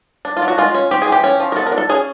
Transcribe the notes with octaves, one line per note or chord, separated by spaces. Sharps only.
D4
F4
F#3
F#4
G#3 F4
C#4
C4 G4
G#4
E3 G4
C#4
F3
A#4
B3 A4
A#4
D4
A4
C#4 G#4